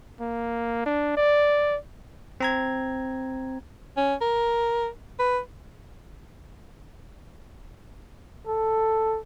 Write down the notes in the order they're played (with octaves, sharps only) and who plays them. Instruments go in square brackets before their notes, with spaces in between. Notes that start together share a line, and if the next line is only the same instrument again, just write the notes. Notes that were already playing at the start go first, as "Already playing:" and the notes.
[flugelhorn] A#3
D4
D5
[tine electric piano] C4 A#5 G#6
[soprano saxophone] C#4
A#4
B4
[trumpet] A4